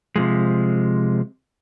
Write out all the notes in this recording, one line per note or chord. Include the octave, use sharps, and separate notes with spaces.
C3 F3 G#3